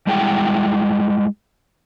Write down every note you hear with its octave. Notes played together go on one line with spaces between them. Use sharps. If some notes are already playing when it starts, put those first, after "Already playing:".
G3 G#3 E4 G#4 F#5 G5